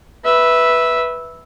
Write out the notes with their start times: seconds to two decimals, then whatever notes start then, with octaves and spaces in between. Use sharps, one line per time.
0.24 B4 E5